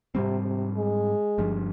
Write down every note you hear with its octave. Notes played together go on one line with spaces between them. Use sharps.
G#2 C3 G3 C4
C3
G#3
G1 G2 F3